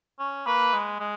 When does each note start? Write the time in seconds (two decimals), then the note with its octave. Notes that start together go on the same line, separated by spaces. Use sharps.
0.20 C#4
0.46 A#3 B4
0.74 G#3
1.00 G#3